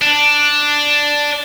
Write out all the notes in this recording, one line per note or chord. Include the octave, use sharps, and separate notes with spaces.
D4